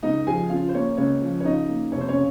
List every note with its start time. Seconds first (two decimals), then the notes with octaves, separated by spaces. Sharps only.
0.03 C#2 D#4 D#5
0.27 F3 G#4 G#5
0.50 C#3 F4 F5
0.69 C5
0.74 A#3 C#4 C#5
0.97 C#2 C#4 C#5
1.22 F3
1.40 C#5
1.45 C#3 D#4 D#5
1.69 A#3
1.92 F1 C#5
2.00 C5
2.08 C#4 C#5
2.15 C#3